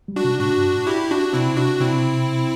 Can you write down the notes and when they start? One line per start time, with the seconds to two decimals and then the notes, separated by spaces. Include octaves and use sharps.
0.08 G3
0.16 D4 F#4
0.24 C3
0.39 A2 D4 F#4
0.56 G2
0.71 A2
0.87 E4 G4
1.10 D4 F#4
1.33 C3 C4 E4
1.57 D4 F#4
1.80 C3 C4 E4